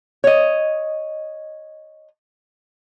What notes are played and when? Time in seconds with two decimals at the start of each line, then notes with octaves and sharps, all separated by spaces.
0.24 C#5 D#5